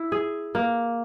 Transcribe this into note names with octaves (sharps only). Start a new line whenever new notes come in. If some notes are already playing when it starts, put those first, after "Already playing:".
Already playing: E4
G#4
A#3